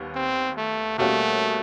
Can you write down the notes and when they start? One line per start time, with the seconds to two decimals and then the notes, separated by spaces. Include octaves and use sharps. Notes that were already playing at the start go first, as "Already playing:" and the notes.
Already playing: D#2 G3 B3
0.15 C4
0.58 A3
0.98 B2 G3 A3 A#3 C#4 F#4